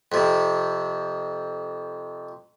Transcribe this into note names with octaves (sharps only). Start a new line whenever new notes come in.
F2 C3